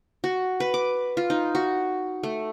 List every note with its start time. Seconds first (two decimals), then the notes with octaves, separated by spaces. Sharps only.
0.24 F#4
0.60 B4
0.74 D6
1.17 F4
1.30 D#4
1.55 F#4
2.23 A3